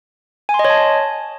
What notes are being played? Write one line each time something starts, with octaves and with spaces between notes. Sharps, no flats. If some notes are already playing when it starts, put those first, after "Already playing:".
G#5
C6
D#5
C#5
A5